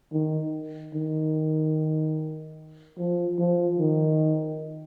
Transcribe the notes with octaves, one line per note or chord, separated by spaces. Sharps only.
D#3
D#3
F3
F3
D#3